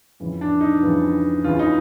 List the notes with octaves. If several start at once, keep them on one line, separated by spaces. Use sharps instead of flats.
F2 C#3 E3
D4
D#4
F2 C#3 E3
D#2 C#3 E3 F4
D#4